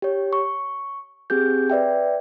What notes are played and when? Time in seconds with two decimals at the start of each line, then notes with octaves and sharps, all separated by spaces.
0.02 G4 C#5
0.33 C#6
1.30 C4 G4 G#4 G6
1.70 B4 D5 E5 G5